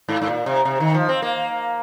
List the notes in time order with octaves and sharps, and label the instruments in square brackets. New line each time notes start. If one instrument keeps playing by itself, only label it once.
[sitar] G#2
G#2
A#2
C3
C3
D#3
F3
C4
A#3